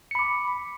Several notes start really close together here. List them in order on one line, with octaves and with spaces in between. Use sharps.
C#7 B5 D6